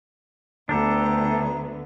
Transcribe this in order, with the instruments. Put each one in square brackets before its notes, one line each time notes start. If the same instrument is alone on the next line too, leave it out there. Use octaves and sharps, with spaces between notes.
[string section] D2 B3 [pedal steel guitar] D4 G4 A4 [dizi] A#5